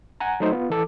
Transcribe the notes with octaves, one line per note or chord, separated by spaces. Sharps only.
F#5 G#5 A#5
F#3 A3 D#4 C5
B3 F4
E3 A4 D6